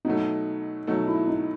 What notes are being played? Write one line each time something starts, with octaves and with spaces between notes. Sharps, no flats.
B2 F#3 A3 D#4
B2 F#3 A3 D#4
E4
D#4